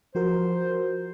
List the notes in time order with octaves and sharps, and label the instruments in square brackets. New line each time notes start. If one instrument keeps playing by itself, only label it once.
[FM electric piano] F3 F#4 A#4 [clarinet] C5